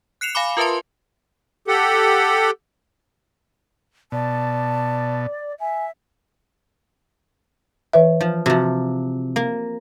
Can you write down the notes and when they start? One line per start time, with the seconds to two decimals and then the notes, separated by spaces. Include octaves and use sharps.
0.21 F#6 C7 C#7 E7 F7
0.35 F5 G#5 B5 D6
0.57 F4 A#4 B4 E5 A5 C6
1.68 G4 A4 F#5
4.12 B2 D5 A5
5.60 E5 G#5
7.93 E3 B4 E5
8.21 F3
8.46 C3 F3 F#4
9.36 A#3